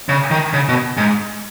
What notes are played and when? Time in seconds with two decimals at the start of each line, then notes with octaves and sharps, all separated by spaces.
0.09 C#3
0.31 D#3
0.53 C#3
0.69 B2
0.97 G#2